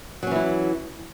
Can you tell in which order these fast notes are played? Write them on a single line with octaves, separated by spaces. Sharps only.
F#3 C#4 E3 E4